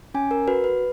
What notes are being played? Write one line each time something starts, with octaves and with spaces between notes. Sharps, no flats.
C#4 G#5
A#4
F#4 B4
B4